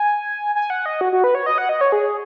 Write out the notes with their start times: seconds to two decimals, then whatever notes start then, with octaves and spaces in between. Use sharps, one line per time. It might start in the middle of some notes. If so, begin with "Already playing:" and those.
Already playing: G#5
0.55 G#5
0.70 F#5
0.86 D#5
1.01 F#4
1.13 F#4
1.24 B4
1.35 C#5
1.46 D#5
1.58 F#5
1.69 D#5
1.81 C#5
1.92 G#4